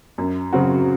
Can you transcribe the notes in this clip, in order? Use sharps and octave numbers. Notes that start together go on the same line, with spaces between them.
F#2
C#3 F#3 C4 F#4